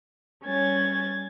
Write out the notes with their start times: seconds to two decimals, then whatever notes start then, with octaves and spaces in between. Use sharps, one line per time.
0.44 G3 C#4 G#6 A6